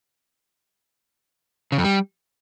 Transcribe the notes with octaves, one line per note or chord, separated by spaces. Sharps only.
C#3
F2
G3